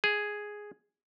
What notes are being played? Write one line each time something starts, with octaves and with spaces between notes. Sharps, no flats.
G#4